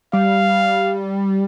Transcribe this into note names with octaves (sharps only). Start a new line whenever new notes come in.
G3 F5